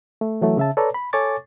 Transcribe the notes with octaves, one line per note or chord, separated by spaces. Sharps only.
A3
E3 F#3 A3
C#3 E5 A5
A4 B4 C#5 D5 A5 A#5
B5
A4 C#5 G#5 C#6 D6 A6